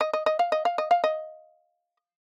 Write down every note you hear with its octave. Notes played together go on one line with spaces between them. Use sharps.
D#5
D#5
D#5
F5
D#5
F5
D#5
F5
D#5